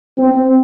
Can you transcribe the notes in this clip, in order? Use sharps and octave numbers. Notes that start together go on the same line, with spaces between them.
C4